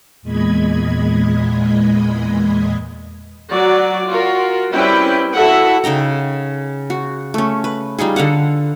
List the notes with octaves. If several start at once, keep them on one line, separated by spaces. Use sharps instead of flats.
E2 A#2 G#3 D#5 B5 G#6
F#3 F#4 D5
F4 F#4 A#4
G3 C4 C#4 E4 B4 G5
E4 F#4 A4 E5 F#5
C#3 D#4 G5 A#5
F#4
A3 C#4
B4
G3 D#4 F4 G#4
D3 A4 F5 F#5